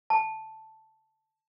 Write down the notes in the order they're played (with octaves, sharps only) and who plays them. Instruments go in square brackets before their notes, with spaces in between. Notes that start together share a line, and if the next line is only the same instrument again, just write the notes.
[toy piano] A5